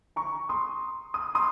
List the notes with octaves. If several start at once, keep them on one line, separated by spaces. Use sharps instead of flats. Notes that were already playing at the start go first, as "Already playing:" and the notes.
A#5 C#6
C6 D#6
D#6
C6 D#6